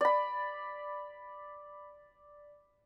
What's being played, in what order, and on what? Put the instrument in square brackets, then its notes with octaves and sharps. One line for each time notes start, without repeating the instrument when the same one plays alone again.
[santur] D5 B5